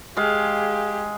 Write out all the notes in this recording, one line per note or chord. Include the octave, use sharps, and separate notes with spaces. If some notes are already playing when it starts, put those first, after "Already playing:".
G#3 G4 G#4 F5